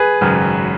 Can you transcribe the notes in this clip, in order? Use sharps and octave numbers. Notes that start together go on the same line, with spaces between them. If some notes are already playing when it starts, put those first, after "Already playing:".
Already playing: G#4 B4
G#1 F#2 C#3 F#3